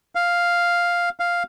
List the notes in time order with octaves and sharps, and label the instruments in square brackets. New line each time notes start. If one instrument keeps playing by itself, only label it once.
[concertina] F5
F5